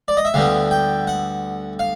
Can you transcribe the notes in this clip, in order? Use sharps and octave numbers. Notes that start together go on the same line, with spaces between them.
D5
D#5
E5
D2 D3 G3 B3 F5
G5
F#5
F5